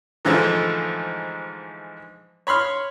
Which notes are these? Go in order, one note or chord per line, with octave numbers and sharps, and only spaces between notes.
G#2 D3 E3 F3 G#3 A3
C#5 B5 C6 F6